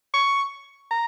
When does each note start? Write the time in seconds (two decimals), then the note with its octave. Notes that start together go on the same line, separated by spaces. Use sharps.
0.14 C#6
0.91 A#5